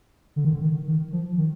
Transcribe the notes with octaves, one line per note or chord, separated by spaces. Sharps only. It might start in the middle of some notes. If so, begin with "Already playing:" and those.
D3
D#3
D3
D#3
D#3
F3
D#3